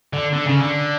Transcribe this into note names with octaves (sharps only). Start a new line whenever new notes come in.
D3
D3
C#3
D3